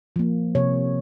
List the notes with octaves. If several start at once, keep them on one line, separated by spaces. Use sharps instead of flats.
F3 A#3
C3 C#5